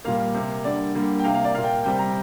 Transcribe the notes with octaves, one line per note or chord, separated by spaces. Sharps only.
A#2 G3 A#3 F5
C3 A#3
D3 G3 A#3 D5
D3 G3 A#3
G5
C3 A#3 F5
F5
D5
A#2 A#3 F5
G5
C3 G3 C4 G5
A#5